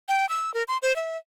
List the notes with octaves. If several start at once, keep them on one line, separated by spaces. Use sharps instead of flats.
G5
E6
A#4
C6
C5
E5